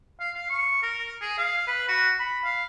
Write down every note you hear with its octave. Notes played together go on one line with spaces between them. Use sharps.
F5
F5
C#6
A#4
G#4
F5
B4
F#4
B5
F5